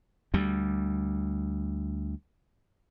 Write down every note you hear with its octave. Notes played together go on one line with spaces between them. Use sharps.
D2 G3